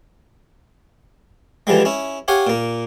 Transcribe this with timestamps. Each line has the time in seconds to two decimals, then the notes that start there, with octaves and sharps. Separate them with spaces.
1.67 D3 E3 F3 G3 G#3
1.85 C#4 E4
2.28 G4 C#5 F5 F#5 G#5
2.47 A#2 A#3